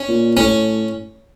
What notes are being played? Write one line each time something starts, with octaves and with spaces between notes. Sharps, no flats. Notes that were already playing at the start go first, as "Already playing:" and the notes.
Already playing: C#4
A#2
A2 C#4